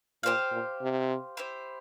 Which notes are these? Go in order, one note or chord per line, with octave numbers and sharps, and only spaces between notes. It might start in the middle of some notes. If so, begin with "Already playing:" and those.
A#2 G4 C5 F5
A#2
C3
E4 G4 C5